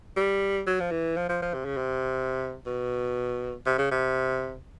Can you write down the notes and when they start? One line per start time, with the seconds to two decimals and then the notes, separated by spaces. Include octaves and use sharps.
0.17 G3
0.67 F#3
0.80 F3
0.91 E3
1.16 F3
1.29 F3
1.42 F3
1.54 C3
1.65 C#3
1.77 C3
2.66 B2
3.66 C3
3.78 C#3
3.91 C3